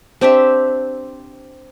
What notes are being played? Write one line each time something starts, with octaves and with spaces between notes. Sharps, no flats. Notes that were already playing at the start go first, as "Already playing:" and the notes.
C4 D4 G4 E5